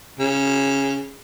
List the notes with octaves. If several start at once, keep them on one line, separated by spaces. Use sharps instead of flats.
C#3